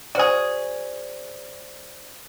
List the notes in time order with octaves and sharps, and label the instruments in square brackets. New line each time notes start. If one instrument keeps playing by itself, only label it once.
[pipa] F#4 G#4 [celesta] C5 D5